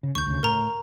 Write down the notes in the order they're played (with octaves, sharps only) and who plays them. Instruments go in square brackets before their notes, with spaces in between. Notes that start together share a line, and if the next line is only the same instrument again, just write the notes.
[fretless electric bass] C#3
[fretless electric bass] D2 [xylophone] C#6 G6
[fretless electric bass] D2 C#3
[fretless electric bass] A2 [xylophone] A#4 A#5